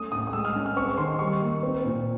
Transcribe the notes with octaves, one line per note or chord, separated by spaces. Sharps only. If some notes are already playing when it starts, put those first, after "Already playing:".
Already playing: A3 C#4 D#6
A2 D#6
D#6
G#3 E6
F6
C#4
F6
C4 C#6
D#3 C6
G3 C#6
A#3
C4
A#2